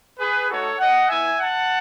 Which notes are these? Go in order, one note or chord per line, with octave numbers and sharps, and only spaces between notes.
G#4 B4
A3 D#4 F#4 A4 C#5
D#5 F#5
B3 E4 E5 G#5
F#5 A5